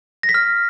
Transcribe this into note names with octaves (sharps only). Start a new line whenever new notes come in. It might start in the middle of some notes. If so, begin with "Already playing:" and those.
A#6
B6
F6